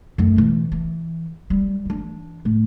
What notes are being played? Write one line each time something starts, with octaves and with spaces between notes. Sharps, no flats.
F#2 A3
B2 E3
E3
G3
E3 D4
A2